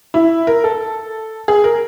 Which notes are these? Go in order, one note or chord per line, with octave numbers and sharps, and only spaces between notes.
E4
A#4
A4
G#4
A#4